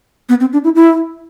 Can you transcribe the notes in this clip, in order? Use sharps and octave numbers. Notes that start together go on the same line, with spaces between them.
B3
C4
D4
E4
E4